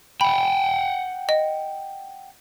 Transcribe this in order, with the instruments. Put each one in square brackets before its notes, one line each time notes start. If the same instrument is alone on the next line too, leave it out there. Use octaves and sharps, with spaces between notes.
[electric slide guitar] F#5 G5 [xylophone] B5
[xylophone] D#5